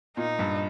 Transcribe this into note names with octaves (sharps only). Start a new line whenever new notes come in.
A#2 D#4
G2